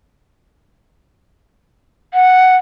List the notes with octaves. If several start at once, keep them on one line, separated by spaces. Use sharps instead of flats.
F#5